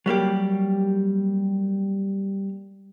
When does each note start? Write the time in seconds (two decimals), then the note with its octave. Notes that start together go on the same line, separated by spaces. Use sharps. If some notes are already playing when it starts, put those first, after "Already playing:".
0.06 F#3 G3 A#3 G4